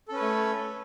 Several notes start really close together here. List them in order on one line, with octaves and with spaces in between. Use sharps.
A4 C#4 B4 C#5 A3